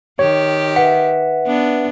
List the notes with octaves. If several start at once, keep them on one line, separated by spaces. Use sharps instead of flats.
D#3 G4 C#5
B4 E5 F#5
B3 D4